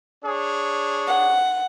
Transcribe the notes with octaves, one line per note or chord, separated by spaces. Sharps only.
D4 G#4 C#5
F#5